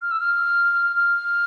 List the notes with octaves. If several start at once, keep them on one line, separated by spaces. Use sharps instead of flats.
F6
E6
F6
F6